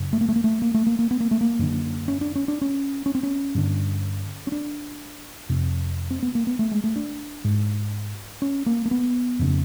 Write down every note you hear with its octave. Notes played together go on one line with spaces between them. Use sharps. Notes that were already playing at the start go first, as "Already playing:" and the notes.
Already playing: F#2 C#3
A3
A#3
A3
A#3
A3
A#3
A3
A#3
A#3
B3
A#3
A3
A#3
F#2 D3
C#4
D4
C#4
D4
C#4
C#4
C4
C#4
G2 D3
C#4
D4
F2 C3
C4
B3
A#3
B3
A3
G#3
A3
D4
G#2
C#4
A#3
A#3
B3
F2 C#3